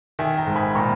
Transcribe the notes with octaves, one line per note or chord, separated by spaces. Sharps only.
D#3 E5 G#5
G5 A#5
G#2
G#5 B5
A#2 A#5 C#6